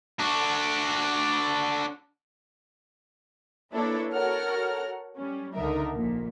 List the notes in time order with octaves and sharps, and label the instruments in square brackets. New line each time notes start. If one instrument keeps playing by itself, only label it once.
[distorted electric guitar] D4 F#4
[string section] A#3 D4 E4 A4 B4 C#5
F#4 A4 A#4 C#5 F#5 F6
G3 C#4
C#2 D3 D#4 A#4 E5
A#1 A#2